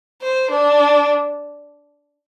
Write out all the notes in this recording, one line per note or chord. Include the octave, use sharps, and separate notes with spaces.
C5
D4